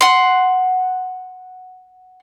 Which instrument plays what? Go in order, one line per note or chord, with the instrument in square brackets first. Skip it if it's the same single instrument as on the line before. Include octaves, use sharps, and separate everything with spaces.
[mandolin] F#5 C6